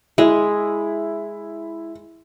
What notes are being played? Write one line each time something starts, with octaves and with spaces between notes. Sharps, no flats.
G#3 E4